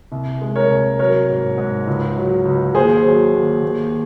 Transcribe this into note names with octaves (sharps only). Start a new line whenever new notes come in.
C2
G#3
A#4 C#5
C2
F#3 A#4 C#5
G#2
G#2
C#2
F#3
C#2
D#2 G#4 C5
F#3
D#2
D#2